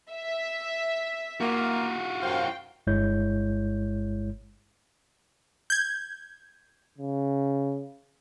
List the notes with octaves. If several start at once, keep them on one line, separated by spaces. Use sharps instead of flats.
E5
A#3 F4 F#4
F#2 C5 F5 G5
G1 G2 G#3 E4 C#5 G6
G6 G#6
C#3